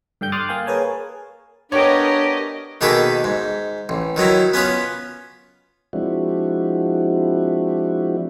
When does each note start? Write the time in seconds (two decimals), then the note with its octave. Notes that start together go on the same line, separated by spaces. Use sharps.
0.21 G2 D3 G5 G6
0.32 C6 D6 D#6 F6 F#6 A6
0.49 A#3 F5 G5 G#5
0.67 G#4 A#4 B4 C#5 G#5 A5
1.72 B3 D4 G4 A#4 C#5 D#5
2.81 B2 D#3 A#3 G#4 A4 B4
3.24 G#2
3.89 A1
4.16 D#3 F#3 D#4 E4
4.54 B3 C#4 F4 B4
5.93 F3 G#3 C4 D4 E4 F#4